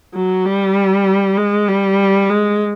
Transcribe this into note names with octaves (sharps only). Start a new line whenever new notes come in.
F#3
G3
G#3
G3
G#3